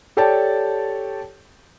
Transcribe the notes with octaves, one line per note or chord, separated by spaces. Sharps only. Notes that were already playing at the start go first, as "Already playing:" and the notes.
G4 A4 C#5 D5 G5 A5